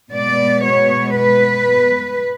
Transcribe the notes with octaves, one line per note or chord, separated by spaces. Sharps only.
B2 G#3 B3 D5
C#5
B4